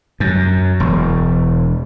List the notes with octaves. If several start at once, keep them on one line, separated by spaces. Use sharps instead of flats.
F#2
E1